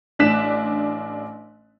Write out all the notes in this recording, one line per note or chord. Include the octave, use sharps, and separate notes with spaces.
A1 D4 F#6 B6 E7